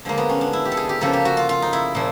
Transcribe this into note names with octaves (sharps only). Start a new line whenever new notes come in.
D3 F3 G#3 A#3
B3
C#4
D4
E4
G4
A4
G#4
G4
C#3 F3 A#3 A4
G4
F#4
F4
F4
D#4
E4
A#2 F3